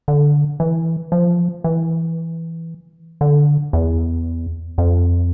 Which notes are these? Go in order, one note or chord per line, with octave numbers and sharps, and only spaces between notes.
D3
E3
F3
E3
D3
E2
F2